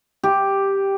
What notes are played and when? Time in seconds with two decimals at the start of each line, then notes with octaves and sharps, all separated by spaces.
0.23 G4